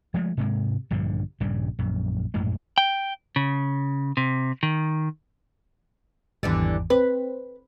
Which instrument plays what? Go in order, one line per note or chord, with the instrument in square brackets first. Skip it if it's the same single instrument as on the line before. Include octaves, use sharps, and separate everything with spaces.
[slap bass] F3 G#3 A3
G#2 C3 G#3
A#1 G2 D3 F3
A#1 G2 C#3 G3
A#1 F#2
A#1 F#2 A2 G#3
[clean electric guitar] G5
C#3
C3
D#3
[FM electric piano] G#1 E2 [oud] D3 E3 G3
[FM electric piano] C4 [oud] B4